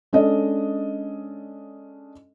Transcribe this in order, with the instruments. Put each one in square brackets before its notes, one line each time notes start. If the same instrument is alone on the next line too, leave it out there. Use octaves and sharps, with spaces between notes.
[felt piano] G#3 C#4 D4 A4 D#5